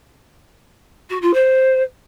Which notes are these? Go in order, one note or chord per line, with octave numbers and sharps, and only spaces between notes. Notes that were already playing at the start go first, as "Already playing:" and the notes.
F#4
F4
C5